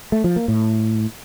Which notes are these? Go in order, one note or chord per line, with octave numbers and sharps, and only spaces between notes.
A3
F3
A#3
A2